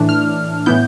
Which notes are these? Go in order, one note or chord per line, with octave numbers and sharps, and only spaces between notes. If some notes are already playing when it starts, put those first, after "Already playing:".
Already playing: A2 E3 A3 D4
F6
A2 E3 B3 E4 G6